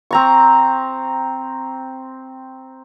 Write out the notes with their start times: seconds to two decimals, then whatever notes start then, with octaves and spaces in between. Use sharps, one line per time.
0.11 C4 A#5 C#6